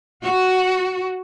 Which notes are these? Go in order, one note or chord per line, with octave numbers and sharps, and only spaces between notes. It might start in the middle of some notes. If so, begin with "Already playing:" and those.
F#4